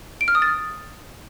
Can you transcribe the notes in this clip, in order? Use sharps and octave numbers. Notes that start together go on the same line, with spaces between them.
D7
F6
D#6
A6